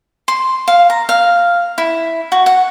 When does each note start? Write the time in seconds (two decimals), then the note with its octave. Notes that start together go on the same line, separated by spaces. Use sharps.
0.28 C6
0.68 F5
0.90 A#5
1.09 F5
1.78 E4
2.32 F#4
2.46 F#5